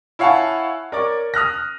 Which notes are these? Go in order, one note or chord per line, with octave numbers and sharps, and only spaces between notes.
E4 C#5 F5 F#5 G#5 A5
A#4 C#5 D5 D6
D#6 F6 F#6 A#6